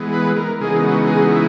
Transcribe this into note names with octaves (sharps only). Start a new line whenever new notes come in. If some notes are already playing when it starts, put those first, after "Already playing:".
Already playing: E3 G#3 B3
B4
A#4
C#3 E3 G#3 B3 D#4 G#4
F#4
G#4
F#4
E4